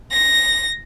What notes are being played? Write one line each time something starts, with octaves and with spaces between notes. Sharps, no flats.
A#6